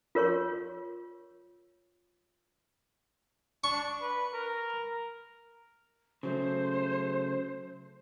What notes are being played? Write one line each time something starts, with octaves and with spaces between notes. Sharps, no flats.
F4 A#4 C#5 C#6
D4 C#6
B4
A#4
C#3 F#3 A3 C5